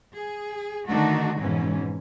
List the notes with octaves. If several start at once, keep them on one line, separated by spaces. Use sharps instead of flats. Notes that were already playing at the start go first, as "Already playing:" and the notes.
G#4
D3 D#3 A3 D4 D#4 F#4
F2 G#2 B2 E3 C#4